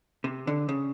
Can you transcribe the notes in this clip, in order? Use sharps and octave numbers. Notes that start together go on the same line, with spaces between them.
C3
D3
C#3